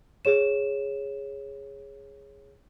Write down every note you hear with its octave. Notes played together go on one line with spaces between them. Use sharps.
G#4 C#5 E7